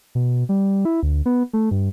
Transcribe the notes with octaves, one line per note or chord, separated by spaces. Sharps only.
B2
G3
E4
D2
B3
A3
G2